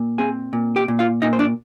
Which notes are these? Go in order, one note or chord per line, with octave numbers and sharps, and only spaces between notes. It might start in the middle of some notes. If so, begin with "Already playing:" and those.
Already playing: A#2
C4 G#4 G#5
A#2
G4 G5
A#2
F4 F5
A#2 D#4 D#5
C5
D4 D5